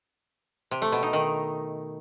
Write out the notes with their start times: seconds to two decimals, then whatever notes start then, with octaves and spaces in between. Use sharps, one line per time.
0.71 C3
0.82 A3
0.92 B2
1.03 D#4
1.13 D#3